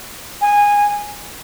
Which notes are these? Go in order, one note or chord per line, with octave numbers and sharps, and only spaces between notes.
G#5